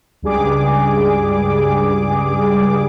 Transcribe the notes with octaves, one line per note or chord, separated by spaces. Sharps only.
C#2 G2 G3 G#4 D6